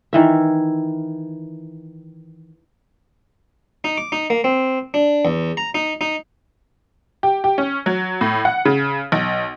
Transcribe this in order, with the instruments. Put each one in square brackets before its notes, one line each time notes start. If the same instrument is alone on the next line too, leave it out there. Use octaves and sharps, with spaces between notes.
[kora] D#3 E3 E5
[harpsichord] D#4
D6
D#4
A#3
C4
D4
E2
A#5
D#4
D#4
[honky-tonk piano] G4
G4
C#4
F#3
A2
F#5
C#3
B1